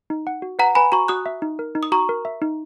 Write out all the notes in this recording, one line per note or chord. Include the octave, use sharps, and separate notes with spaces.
D#4
F#5
F#4
B4 F#5 A#5
B4 G#5 B5
F#4 A#5 C#6
F#4 D#6 F#6
E5
D#4
A#4
D#4
D#6
F#4 A#5 C#6
A#4
E5
D#4